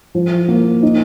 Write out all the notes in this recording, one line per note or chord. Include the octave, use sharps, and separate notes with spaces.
F3
A#3
D#4